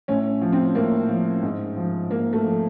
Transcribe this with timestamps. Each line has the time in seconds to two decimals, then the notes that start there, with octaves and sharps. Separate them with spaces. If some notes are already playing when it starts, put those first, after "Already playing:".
0.08 A2 C#4
0.42 F3
0.52 C4
0.75 A2 A#3
1.09 F3
1.42 G#2
1.76 F3
2.10 G#2 A#3
2.33 A3
2.44 F3